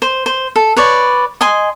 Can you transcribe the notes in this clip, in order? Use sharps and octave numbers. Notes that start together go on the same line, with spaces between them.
C5
C5
A4
B4 C#5 D5
D#5 G#5 C6